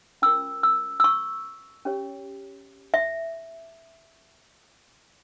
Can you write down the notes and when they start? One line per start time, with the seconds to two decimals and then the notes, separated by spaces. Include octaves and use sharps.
0.22 C#4 F4 A#4 E6
0.63 E6
1.00 E6
1.04 C#6
1.85 C#4 G4 C#5
2.94 E5